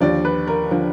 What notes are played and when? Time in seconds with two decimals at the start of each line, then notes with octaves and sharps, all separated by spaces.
0.01 D#2 D3 F3 D5
0.25 B4
0.47 A#4
0.71 D3 F3